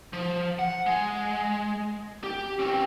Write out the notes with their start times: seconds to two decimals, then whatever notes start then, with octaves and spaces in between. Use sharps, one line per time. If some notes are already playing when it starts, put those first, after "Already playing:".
0.13 F3
0.59 F#5
0.86 G#3
2.24 G4
2.59 C4 C#4